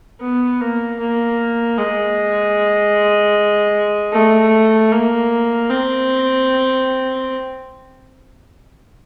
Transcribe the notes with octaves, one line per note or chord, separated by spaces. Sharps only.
B3
A#3
A#3
G#3
A3
A#3
C4